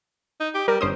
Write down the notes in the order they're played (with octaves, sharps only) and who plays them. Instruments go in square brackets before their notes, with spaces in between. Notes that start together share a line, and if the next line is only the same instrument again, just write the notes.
[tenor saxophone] D#4
G4
[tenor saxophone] G3 [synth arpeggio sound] A#4
[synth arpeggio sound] G1 C5 D#6 [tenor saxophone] C#4